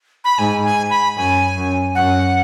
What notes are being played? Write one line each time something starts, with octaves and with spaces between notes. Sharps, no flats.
B5
G#2 G#5
G#5
B5
F#2 G#5
F#2
F#2 F#5